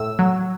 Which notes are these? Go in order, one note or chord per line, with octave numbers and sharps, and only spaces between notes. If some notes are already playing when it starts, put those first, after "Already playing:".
Already playing: A2 E6
F#3